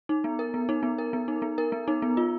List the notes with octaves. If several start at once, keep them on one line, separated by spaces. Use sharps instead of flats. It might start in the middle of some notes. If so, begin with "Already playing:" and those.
D#4
B3
A#4
B3
D#4
B3
A#4
B3
D#4
B3
A#4
B3
D#4
B3
F4